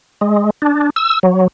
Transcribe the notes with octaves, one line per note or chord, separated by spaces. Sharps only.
G#3
D4
E6
F#3